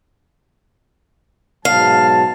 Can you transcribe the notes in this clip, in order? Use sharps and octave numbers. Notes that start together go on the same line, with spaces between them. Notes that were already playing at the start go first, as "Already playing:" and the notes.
G#2 B2 F#3 F5 A5